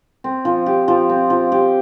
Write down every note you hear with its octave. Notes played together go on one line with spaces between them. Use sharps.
C4
F3
G4
F3
C4
F3
G4